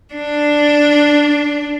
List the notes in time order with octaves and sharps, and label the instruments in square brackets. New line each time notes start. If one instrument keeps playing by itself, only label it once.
[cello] D4